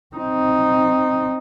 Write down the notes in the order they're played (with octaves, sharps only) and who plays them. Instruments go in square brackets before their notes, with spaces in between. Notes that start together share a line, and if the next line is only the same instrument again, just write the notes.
[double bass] C4 D#4